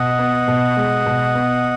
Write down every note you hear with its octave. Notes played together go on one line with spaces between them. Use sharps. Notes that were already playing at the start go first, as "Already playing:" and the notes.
Already playing: B2 D#5 F#5
B3
B2
G#3
B2
B3